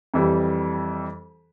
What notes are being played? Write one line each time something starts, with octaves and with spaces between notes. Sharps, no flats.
F2 E3 G3